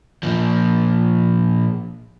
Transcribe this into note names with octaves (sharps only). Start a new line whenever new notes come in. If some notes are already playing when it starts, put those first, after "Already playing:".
A#2 F3